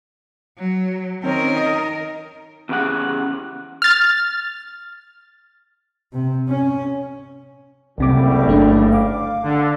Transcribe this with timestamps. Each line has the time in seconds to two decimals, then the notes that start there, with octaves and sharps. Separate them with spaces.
0.58 F#3
1.23 D#3 C4 C#4 A#4
1.56 D#5
2.69 E2 C#3 G4 F#5
3.82 F6 A6
6.13 C3
6.49 C#4
7.98 F#1 C2 A2 C3 G3 D6
8.47 G1 A3 D4
8.92 F5 D6
9.43 D3